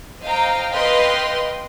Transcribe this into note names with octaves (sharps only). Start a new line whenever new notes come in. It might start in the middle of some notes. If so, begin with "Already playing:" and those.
C5 D#5 F5 G5 A#5
B4 D#5 F5 G5 C6